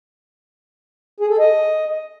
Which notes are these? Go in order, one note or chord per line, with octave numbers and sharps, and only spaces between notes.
G#4
A4
D#5